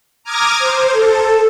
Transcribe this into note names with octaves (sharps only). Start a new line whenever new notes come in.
A#5 D6 D#6 F6 G#6 A#6
C5
A4